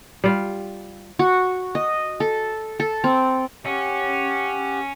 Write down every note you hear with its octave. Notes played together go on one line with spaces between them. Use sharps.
G3 F4
F#4
D#5
A4
A4
C4
C#4 G4 F#5